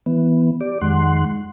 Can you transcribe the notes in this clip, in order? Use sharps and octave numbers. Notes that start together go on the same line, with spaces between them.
E3 B3
G4 D5
F2 D#3 G#3 F#5 C6